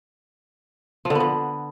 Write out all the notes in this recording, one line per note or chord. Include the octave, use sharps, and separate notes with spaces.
F3
D3
B3
D3